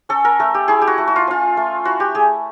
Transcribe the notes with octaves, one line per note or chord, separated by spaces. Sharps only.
C#4 A4
A#4
A3 A4
G4
E4 G#4
G4
F#4
A3
F#4
F4
C#4 F4
A3
E4 F#4
G4
A3 G#4